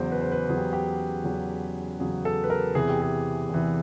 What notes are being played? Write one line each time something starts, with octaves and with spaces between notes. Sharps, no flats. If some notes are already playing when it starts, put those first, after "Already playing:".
Already playing: E2 C#3 F#3 C5
B4
C5
B4
E2 C#3 F#3 G#4
G4
G4
E2 C#3 F#3
E2 C#3 F#3 G#4
A4
B4
A#4
E2 C3 E3 G#4
G4
G#4
E2 C3 E3